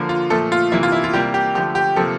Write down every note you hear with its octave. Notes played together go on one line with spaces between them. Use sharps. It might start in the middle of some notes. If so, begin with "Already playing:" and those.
Already playing: D3 F3 A#3
F4
A#2 F3 A3 A4
F4
C3 E3 A#3 E4
F4
E4
F4
C3 G3 A#3 G4
G4
D3 F3 A3 G4
G4
C3 F3 A#3 A4